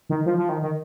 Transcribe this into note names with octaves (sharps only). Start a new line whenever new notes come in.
D#3
F3
F3
D#3
D#3